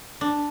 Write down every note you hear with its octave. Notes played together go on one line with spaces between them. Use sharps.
D4